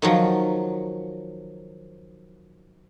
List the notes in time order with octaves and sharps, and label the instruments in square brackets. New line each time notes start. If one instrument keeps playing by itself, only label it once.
[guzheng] D#3 F3 F#3